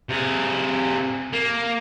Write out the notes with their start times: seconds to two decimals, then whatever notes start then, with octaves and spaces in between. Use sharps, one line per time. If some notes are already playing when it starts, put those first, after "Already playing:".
0.09 C3 G#4
1.33 A#3